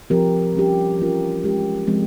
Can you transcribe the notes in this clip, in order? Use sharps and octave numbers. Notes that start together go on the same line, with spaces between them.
F3 C4 G4 A#4
G3 C#4 G4
E3 G3 C#4 F4 A#4
G#3 C#4 G4
F3 G#3 C4